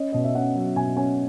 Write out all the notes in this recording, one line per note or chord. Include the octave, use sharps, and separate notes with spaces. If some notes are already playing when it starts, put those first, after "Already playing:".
Already playing: C#4 D#5
B2 D#5
E5
C#4 F#5
F#3
B2 G#5
C#4 G#5